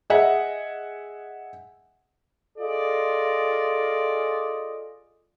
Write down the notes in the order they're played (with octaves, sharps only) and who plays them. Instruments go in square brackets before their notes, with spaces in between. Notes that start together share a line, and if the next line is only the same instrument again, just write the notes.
[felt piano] G#4 D#5 E5 F#5
[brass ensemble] F4 G#4 A4 D5 D#5